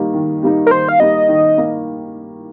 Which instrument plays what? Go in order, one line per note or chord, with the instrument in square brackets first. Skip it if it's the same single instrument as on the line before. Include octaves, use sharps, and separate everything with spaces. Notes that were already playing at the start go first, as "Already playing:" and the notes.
Already playing: [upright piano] D#3 G3 A#3 D#4
D#3
G3 A#3 D#4
[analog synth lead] A#4
[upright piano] D#3 [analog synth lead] C5
[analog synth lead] F5
[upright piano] G3 A#3 D#4 [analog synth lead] D#5
[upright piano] D#3
A#3